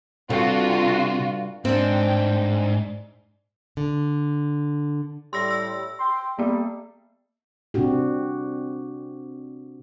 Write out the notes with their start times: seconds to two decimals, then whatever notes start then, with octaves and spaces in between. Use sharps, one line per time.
0.30 G2 C3 F4 F#4 A4
1.65 G#2 C4 D4 G5
3.77 D3
5.33 A2 G3 C6 E6 A#6
5.51 E6
5.99 G5 C6
6.39 G3 A#3 B3
7.74 C3 C4 D4 F#4 G4